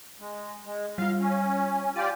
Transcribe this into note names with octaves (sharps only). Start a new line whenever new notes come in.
G#3
G#3
G3 F4 F5
C#4
F4 G4 D5 D#7